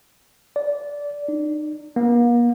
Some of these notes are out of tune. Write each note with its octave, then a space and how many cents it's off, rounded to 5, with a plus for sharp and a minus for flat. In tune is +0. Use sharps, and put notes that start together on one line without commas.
D5 -15
D#4 -40
A#3 +40